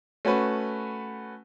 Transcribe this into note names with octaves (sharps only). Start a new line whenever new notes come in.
A3 C#4 F#4 B4